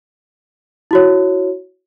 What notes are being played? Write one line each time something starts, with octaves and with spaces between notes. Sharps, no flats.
E4 F#4 C#5